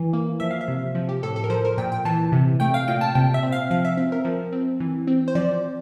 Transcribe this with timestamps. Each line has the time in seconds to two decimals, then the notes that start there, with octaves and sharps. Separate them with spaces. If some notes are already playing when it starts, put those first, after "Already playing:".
Already playing: E3
0.13 A#3
0.40 F3 E5
0.51 F5
0.61 E5
0.68 C3
0.95 F3
1.09 G4
1.23 A2 A4
1.36 A4
1.44 A#4
1.50 F3 C5
1.65 A#4
1.78 A#2 G5
1.92 G5
2.05 E3 A5
2.32 C3
2.60 A3 G5
2.74 F5
2.88 A#2 G5
3.01 A5
3.15 C3 G5
3.34 E5
3.43 C4
3.52 F5
3.71 F3 F5
3.85 E5
3.97 C4 E5
4.12 A#4
4.25 F3
4.52 C4
4.80 E3
5.07 C4
5.28 C5
5.35 F3 D5